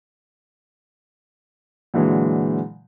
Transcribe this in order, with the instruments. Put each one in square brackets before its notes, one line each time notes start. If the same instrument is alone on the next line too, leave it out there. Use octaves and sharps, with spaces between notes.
[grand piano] A#2 D3 E3 F#3 G#3